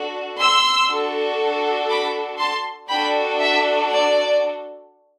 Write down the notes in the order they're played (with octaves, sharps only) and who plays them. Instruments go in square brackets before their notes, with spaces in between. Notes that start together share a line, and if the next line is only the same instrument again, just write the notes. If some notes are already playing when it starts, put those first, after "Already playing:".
Already playing: [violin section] D4 F#4 A4
C6 E6
D4 F#4 A4
B5 D6
A5 C6
D4 F#4 A4 G5 B5
E5
D5